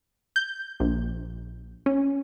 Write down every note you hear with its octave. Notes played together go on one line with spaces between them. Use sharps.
G6
A#1
C#4